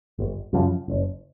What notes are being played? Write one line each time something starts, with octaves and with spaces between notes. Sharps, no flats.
G1
F#2 C#3 F3
F#1